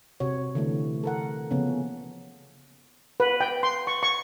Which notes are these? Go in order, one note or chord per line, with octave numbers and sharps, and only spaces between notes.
C3 F#4 C#5
D3 E3 A3
A4 A#4 F#5
C#3 F3 A#3 B3 C#4
B4
G5
C6
C#6
C#6